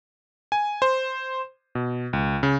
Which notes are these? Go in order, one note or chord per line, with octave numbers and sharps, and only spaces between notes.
G#5
C5
B2
C#2
C#3